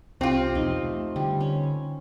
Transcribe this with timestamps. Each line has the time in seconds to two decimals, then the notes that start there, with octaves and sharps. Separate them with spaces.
0.21 C2 C4 F4 G4
0.55 E2 B2 F3 D#4
0.84 A3
1.16 D3 G3
1.41 C#4